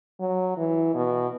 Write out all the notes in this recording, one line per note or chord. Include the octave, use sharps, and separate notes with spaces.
F#3
E3
B2